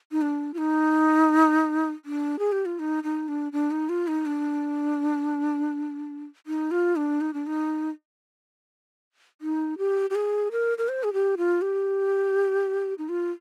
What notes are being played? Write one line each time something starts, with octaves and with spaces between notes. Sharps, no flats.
D#4
D4
F4
D#4
D4
G#4
G4
F4
D#4
D#4
D4
D4
D#4
F4
D#4
D4
D#4
F4
D4
D#4
D4
D#4
D#4
G4
G4
G#4
A#4
A#4
C5
G#4
G4
F4
G4
D#4
F4